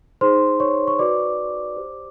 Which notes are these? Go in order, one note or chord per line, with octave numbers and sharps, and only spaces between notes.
D#4 G#4 C5 C6
C#5 C#6
C#6
F#4 B4 D5 D6
G4 C5